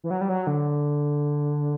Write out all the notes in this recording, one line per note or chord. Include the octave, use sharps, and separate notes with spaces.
E3
F#3
G3
F#3
D3